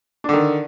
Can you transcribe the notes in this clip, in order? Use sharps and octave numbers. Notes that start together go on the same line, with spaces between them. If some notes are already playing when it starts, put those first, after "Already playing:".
D3 D#3 D4